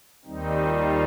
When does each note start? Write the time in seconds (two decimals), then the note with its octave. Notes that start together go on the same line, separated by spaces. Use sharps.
0.25 D#2 D#3 G3 C4 D#4
0.66 F4